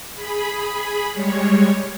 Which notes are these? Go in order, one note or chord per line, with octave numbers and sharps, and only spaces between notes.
G#4 B5
G3 G#3 C#5